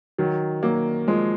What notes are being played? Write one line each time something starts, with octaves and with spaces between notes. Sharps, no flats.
D#3 F#3
F#3 A#3
F3 G#3